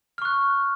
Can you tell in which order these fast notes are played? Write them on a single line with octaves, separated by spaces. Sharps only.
F6 C#6 F#6